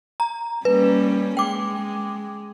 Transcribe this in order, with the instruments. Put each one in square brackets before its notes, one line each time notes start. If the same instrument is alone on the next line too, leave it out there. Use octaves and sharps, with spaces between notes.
[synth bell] A#5
[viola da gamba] G3 A#3 C#4 [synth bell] B4
[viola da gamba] G#3 [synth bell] G5 D6